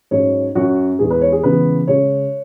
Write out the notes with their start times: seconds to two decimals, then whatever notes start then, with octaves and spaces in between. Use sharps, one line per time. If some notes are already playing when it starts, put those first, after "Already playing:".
0.11 G#2 F#3 C#4 C#5
0.55 F#2 F#3 C#4 F#4
0.99 E2 E3 G#3 G#4
1.10 B4
1.21 C#5
1.33 G#4
1.43 C#3 E3 G#3 B3 B4
1.88 C#3 G#3 C#4 C#5